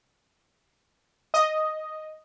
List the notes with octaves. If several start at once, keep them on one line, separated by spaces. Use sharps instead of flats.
D#5